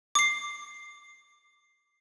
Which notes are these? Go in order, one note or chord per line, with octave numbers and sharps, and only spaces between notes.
D6 C7